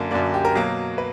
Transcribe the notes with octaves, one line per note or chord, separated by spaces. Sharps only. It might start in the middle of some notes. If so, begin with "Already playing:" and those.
Already playing: F#2 D3 A#3
F#2 D3 A#3 D5
G4
A#4
B2 F#3 A#3
B4